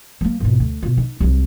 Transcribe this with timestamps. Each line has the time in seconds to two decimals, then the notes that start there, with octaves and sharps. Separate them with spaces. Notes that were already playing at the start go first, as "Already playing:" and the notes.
0.21 F#3 A#3
0.40 G#1 B2
0.60 D2
0.82 B2 F4
0.98 D#4
1.21 C2 F#3